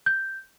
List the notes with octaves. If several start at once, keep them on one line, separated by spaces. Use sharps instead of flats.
G6